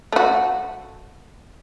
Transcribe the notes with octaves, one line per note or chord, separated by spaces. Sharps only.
A3 F#4